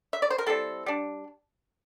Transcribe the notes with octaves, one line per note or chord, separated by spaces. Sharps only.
E5
D5
C5
A#4
G3 C4 E4 A4
G3 D4